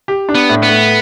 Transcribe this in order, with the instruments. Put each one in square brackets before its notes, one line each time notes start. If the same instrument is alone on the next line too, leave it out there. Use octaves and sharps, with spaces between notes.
[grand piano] G4
D4
[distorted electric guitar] B3
[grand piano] A2
[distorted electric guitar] B3
[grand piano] A3